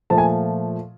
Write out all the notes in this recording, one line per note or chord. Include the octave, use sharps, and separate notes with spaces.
A#2 F3 A3 A5
G#5